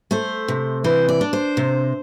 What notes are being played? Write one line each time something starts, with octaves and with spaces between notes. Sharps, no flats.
A3 C5
C3
E3 C5
D5
D4
C5
C3